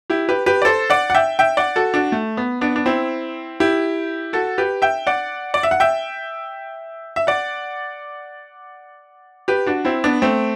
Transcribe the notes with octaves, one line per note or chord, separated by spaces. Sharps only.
E4 G4
G4 B4
G4 B4
D5
A4 C5
D5 F#5
F#5
E5 G5
E5 G5
D5 F#5
F#4 A4
D4 F#4
A3
B3
B3 D4
D4
C4 E4
E4 G4
F#4 A4
G4 B4
E5 G5
D5 F#5
D5
E5
F#5
E5 G5
E5
D5 F#5
G4 B4
D4 F#4
C4 E4
B3 D4
A3 C4